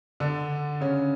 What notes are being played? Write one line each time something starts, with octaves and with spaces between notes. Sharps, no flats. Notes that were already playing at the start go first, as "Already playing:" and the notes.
D3 D4
C#3 C#4